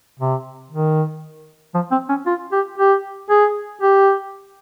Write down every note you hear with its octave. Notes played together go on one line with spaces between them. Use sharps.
C3
D#3
F3
C4
C#4
F4
G4
G4
G#4
G4